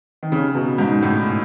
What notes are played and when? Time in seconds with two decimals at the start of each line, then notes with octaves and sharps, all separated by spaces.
0.23 D#3
0.32 C#3
0.55 B2
0.78 G#2
1.02 A2